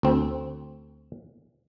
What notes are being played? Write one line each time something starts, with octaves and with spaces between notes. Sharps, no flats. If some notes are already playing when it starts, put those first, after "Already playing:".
D2 C4